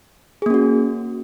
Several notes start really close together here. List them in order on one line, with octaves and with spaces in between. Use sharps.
G#4 A#3 C#4 F#4